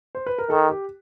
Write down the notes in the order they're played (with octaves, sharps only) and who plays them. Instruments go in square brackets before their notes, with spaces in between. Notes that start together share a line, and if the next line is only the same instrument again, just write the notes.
[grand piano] C5
B4
A#4
[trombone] D#3 [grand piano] A4
[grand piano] G4